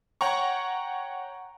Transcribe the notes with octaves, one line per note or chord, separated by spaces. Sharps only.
C#5 F#5 G5 A#5 C#6